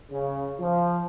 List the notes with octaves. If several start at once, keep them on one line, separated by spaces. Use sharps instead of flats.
C#3
F3